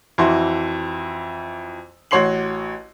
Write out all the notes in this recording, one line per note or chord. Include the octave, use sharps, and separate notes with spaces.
F2 E3 E4 F#4 C6
A1 F#4 C#5 C6 C7 F#7